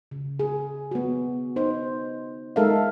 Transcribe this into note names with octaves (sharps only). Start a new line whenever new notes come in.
C#3
G#4
B3 F#4
D#4 C5
G#3 D#4 A4 A#4 E5 F5